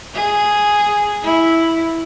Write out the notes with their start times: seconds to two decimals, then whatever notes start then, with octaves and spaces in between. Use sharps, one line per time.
0.14 G#4
1.22 E4